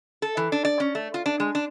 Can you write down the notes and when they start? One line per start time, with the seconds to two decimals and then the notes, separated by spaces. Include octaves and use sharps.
0.22 A4
0.37 E3
0.52 D4
0.65 D5
0.80 C#4
0.95 A3
1.14 F4
1.26 D4
1.40 G#3
1.55 D4